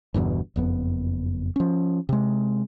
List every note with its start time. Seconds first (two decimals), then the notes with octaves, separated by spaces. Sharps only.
0.14 G1 E2 G2 B2
0.56 F#1 F2 B3
1.56 F3 C#4
2.09 C3 G#3